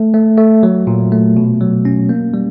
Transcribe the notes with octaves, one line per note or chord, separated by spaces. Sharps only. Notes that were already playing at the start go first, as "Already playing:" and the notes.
Already playing: A3
A3
A3
F#3
A#2
A3
B2
F#3
C#4
A#3
G3